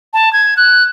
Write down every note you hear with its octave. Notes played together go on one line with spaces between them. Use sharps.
A5
G#6
F#6